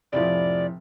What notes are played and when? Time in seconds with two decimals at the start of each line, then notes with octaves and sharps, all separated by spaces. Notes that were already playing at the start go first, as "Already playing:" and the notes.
0.12 F1 A2 F3 D5